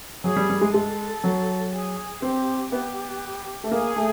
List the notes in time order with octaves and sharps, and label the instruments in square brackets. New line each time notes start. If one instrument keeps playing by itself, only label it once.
[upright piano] F#3 [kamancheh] G#4
[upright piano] G3
G3
G#3
[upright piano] G#3 [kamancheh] A4
[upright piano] F#3
[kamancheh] G#4
[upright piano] C4 [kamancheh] G4
[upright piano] B3 [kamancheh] G4
[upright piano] A3
[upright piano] A#3 [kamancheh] G#4
[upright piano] A3